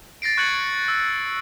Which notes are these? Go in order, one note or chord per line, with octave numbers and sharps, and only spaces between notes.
A6 A#6 C7 D7
C#6 F#6 G#6 C#7 F#7
E6